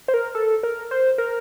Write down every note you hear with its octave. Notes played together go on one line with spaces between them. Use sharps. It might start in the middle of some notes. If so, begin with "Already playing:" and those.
C5
A#4
A4
A#4
C5
A#4